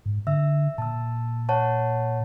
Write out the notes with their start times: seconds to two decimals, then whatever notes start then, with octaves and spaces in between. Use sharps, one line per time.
0.06 G#2
0.27 D3 E5 E6
0.78 A#2 A5 E6
1.49 C#5 F#5 A5